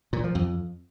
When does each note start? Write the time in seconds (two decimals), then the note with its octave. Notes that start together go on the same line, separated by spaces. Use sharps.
0.13 A#2
0.24 F3
0.35 F2